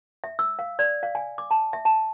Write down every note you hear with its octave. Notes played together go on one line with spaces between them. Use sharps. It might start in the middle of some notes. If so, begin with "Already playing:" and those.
E5
E6
F5
D5
F5
G#5
D6
A5
E5
A5